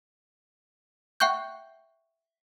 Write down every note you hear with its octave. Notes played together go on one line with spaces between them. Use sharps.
E5 F#5 G5 C#6 F#6 G6